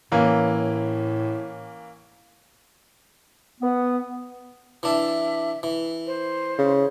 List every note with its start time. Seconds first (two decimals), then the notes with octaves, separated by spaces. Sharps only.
0.12 A2 E3 A#3 C#4
3.61 B3
4.83 E3 D4 E5
5.63 E3
6.07 C5
6.58 C#3